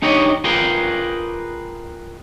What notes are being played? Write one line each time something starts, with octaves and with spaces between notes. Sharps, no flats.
D4 D#4 G4 C#5 D#5
F4 G#4 A#4 B4 F5 G5